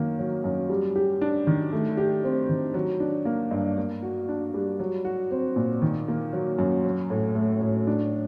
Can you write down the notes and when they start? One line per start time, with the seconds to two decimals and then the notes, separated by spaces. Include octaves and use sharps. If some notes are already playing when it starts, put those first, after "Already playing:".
Already playing: F#2 D#3 A#3
0.19 F#3
0.44 F#2
0.69 G3
0.96 G4
1.21 D4
1.47 D#3
1.72 A3
1.97 G4
2.24 C4
2.49 D#3
2.74 F#3
3.00 D4
3.25 A#3
3.51 G2
3.77 A#3
4.02 F#4
4.29 D4
4.54 G3
4.80 F#3
5.05 F#4
5.31 C4
5.56 A#2
5.82 D#3
6.08 A#3
6.33 F#3
6.58 F#2
6.85 F#3
7.10 A2
7.35 A3
7.61 A2
7.87 D4